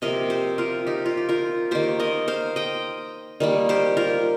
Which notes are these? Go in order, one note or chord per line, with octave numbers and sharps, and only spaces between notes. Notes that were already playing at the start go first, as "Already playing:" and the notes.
C3 F3 A#3 A#4 D#5
G4 C5
F4 A#4
D#4 G4
F4
G4
F4 A#4
D#3 A#3 G4 C5
A#4 D#5
C5 F5
D#5 G5
D#3 G3 A#3
G4 C5
F4 A#4